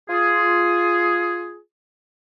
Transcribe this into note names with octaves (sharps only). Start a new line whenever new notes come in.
F4 G#4